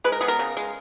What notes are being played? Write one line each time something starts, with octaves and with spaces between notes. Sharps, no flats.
G#3 B4
A#4
B3 G#4
A#4
C#3
G#3